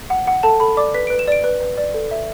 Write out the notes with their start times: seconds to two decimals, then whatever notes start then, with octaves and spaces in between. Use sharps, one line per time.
0.10 F#5
0.27 F#5
0.43 A4 A5
0.60 A4 B5
0.77 D5 D6
0.94 B4 B6
1.07 D7
1.10 B4
1.19 E7
1.28 D5 D7
1.44 B4
1.61 B4
1.77 D5
1.94 A4
2.11 E5